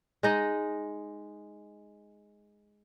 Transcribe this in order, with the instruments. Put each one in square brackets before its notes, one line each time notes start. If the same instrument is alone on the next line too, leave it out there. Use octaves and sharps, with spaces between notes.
[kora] G#3 D#4 D#5